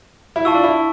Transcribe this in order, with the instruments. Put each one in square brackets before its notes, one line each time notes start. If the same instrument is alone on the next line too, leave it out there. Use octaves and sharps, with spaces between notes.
[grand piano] E4
[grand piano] F4 [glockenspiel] A5 C#6 E6
[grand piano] D4
E4